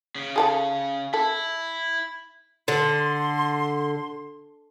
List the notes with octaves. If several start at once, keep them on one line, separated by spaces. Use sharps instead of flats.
C#3
G#4 A4 A5
E4 A4
D3 C6